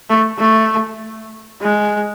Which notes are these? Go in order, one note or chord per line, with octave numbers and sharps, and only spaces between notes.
A3
A3
G#3